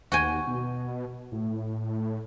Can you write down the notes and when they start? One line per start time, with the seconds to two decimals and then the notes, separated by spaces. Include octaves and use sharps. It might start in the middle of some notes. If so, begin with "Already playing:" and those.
0.12 D#2 F#4 G5 G#5
0.47 B2
1.32 A2